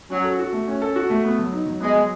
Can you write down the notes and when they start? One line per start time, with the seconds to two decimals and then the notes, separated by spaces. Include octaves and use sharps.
0.10 F#3 C#4
0.24 A4
0.39 F#4
0.53 A3
0.68 C#4
0.82 A4
0.96 F#4
1.10 A3
1.25 B3
1.39 F#3
1.53 D#4
1.66 F#3
1.81 G#3 B3
1.95 F#3